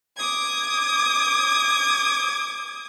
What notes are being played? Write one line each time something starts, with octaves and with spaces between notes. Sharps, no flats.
D6 D#6 G#6